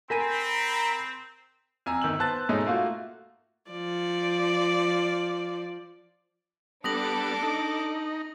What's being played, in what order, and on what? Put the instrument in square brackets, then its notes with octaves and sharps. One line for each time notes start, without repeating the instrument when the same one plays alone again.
[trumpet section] C4 [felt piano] A#4 G#5 D#7 [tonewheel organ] A#5 B5
[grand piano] F2 G#5 A#5 E6
G1 D#3 E6 F#7
B3 C5 A5 F#6 A6
G#2 B2 G#3 A3 C#4 D#4
A3 A#3 F4 F#4
[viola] F3 D5
[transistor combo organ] G3 B3 [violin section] D4 A4 D6 [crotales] D#6 A#6 F#7
[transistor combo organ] D#4